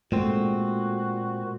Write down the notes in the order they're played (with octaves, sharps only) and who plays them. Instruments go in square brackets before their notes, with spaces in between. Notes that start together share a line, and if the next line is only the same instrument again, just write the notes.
[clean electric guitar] A#2 C4 [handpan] G#3 A3 [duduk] F#4